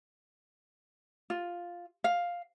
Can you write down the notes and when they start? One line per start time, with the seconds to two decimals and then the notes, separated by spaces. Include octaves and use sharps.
1.30 F4
2.04 F5